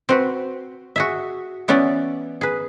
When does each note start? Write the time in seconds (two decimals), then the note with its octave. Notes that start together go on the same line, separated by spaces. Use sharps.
0.09 C4 F#4 B4
0.96 F#4 G#4 E5
1.68 E3 B3 C#4 E4 D5
2.41 G#4 B4